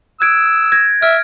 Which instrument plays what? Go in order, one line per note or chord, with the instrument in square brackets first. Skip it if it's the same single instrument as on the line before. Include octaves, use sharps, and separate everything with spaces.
[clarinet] E6 [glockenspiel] F#6 G#6 D7
[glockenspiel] G#6 A#6
[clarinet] E5 [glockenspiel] F6 D7